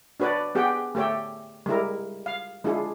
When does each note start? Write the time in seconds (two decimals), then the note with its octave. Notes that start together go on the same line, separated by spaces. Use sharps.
0.20 D4 F#4 B4 C#5 D5
0.55 B3 G4 G#4 F#5 G5
0.95 A3 G4 A4 C#5 G5
1.66 G3 G#3 E4 A#4
2.26 F5
2.64 G#3 D4 E4 F4 G#4